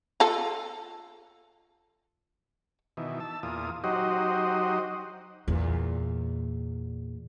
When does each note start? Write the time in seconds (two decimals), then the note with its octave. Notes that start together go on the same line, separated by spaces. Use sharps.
0.20 F4 A4
2.97 B2 D#3 E3
3.20 A5 E6
3.43 E2 A#2 F4 D#6
3.84 F#3 D#4 F#4 G4 C5 D#5
5.48 E2 A#2